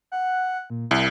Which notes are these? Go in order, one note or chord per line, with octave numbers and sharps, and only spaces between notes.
F#5
A#2
C2 E4